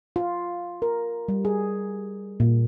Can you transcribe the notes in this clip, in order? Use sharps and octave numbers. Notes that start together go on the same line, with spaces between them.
F4
A#4
G3
G#4
A#2